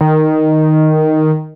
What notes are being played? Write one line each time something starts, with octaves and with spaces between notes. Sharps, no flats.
D#3